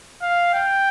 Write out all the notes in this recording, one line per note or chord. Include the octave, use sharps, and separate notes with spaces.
F5
G5